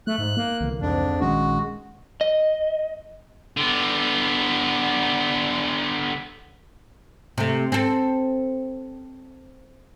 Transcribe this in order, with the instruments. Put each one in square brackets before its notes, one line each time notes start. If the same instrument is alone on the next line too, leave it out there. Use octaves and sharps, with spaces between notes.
[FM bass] A3 [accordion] F#6
[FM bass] G#2
A#3
[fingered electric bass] C2 D3 E3
[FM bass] F2 [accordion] G#2 D4
[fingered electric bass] A#1 D#3 C#4 [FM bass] G#3 [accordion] F#4
[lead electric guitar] D#5
[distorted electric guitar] D3 B3
[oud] C3 A3
C4 A4